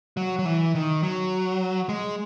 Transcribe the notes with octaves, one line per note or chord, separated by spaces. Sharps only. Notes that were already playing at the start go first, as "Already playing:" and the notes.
F#3
F#3
E3
D#3
F#3
G#3